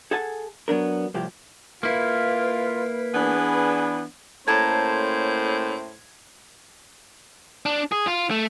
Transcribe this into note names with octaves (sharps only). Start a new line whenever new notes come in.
G#4 A4 F#5 G#5 A5
F#3 B3 D4 A#4
C2 A2 F3 G4
A#3 E4 F4 B4
E3 B3 D4 G#4
A2 A#3 C#4 A4 C5 A5 A#5 G#6
D4
G#4
F4
A3